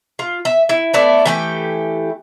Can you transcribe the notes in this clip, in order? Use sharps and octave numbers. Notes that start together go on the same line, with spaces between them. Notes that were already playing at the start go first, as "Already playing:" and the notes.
F4
E5
E4
A3 B3 E4 D5
E3 A3 G4